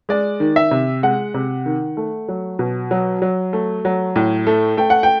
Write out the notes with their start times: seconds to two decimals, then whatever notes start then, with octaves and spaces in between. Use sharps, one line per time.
0.09 G#3 D5
0.40 D#3
0.56 E5
0.71 C3
1.03 G#3 F#5
1.34 C3
1.66 D#3
1.97 A3
2.28 F#3
2.59 B2
2.91 F#3
3.22 F#3
3.53 A3
3.85 F#3
4.16 A2
4.47 A3
4.77 A3 G5
4.90 F#5
5.03 G5